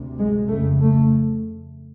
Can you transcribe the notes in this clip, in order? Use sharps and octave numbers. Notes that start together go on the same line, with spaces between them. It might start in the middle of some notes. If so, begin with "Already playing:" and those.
Already playing: D2 C3
G#3
F2 C#3 A3
A3